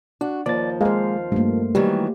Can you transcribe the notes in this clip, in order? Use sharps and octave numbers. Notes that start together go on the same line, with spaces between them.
D4 F#4
D#2 F3 D5 A6
G#3 A#3 C5 F5
G2 A3 A#3
D#3 E3 F#3 G3 G4